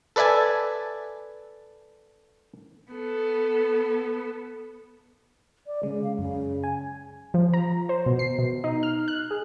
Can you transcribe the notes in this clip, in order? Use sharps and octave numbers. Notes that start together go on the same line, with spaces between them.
A4 B4 D5 E5 G#5 A5
B3 A4
D5
C#3 G#3
F5
F#2 C#3
G#5
F3
A#5
C5
B2
C7
B2
D#4
F6
F#6
G#4